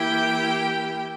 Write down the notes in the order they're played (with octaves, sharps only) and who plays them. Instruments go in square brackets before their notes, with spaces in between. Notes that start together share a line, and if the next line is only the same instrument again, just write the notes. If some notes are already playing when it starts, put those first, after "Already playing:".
Already playing: [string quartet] E3 A#3 E4 G4 G5